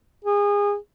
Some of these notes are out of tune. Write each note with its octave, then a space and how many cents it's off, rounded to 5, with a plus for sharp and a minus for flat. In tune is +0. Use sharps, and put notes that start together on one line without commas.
G#4 -30